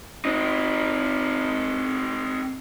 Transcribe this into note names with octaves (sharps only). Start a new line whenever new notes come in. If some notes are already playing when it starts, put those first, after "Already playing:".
C4 D#4